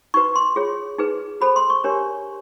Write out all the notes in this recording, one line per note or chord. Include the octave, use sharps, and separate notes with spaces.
D#4 F#4 B4 C#6
C6
F4 G#4 C#5
D#4 G#4 B4
F#4 A4 C5 B5
C6
C#6
D4 G4 A#4 C#5